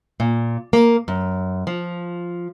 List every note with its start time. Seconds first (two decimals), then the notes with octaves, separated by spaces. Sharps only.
0.20 A#2
0.73 A#3
1.08 F#2
1.67 F3